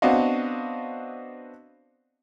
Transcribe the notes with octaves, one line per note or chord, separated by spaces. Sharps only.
B3 C4 D4 F#4 D#5 F5